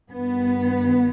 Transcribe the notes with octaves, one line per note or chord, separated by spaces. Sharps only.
G2 D#3 B3